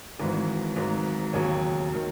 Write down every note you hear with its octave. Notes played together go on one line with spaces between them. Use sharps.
G#1 G#2 E3 F#4
G#1 G#2 F#3
E1 D#2 C#3 F#3 C#5
D#3 F#3